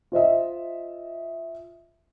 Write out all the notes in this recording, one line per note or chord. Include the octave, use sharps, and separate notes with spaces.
F4 C5 D#5 E5